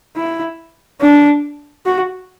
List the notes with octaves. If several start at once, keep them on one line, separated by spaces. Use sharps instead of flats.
E4
D4
F#4